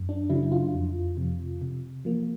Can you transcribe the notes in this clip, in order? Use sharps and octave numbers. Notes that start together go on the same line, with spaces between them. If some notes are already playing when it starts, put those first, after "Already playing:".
Already playing: F#2
D4
C#3 F#3 E4
E4
F4
F2
C3 F3
C3
F3 A#3